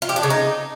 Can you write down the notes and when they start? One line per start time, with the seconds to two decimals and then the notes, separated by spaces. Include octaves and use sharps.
0.02 F4
0.09 G4
0.16 D4
0.23 C#3
0.30 D#4